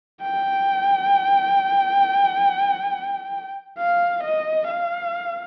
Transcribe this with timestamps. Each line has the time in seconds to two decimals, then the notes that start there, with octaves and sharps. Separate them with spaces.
0.22 G5
3.79 F5
4.24 D#5
4.68 F5